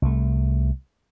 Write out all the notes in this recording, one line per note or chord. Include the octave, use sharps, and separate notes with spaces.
C2 A3